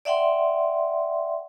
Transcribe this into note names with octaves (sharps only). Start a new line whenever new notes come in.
D5 E5 F#5 G5 C6